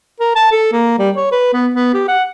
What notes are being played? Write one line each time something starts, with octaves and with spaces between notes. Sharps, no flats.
A#4
A5
A4
A#3
G3
C#5
B4
B3
B3
G4
F#5